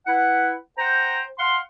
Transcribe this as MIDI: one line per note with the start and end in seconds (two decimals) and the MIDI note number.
0.07 0.53 64
0.07 0.53 71
0.07 0.53 78
0.78 1.21 72
0.78 1.21 78
0.78 1.21 79
0.78 1.21 82
1.38 1.57 77
1.38 1.57 78
1.38 1.57 84